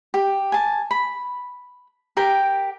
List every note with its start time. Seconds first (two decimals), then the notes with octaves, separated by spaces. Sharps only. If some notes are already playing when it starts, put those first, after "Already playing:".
0.14 G4
0.52 G#5 A5
0.91 B5
2.17 G4 A#4 G5